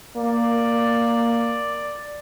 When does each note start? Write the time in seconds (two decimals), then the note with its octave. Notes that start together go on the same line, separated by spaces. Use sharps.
0.17 A#3 D5